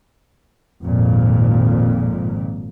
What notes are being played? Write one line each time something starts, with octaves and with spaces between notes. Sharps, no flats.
G#1 F2 A#2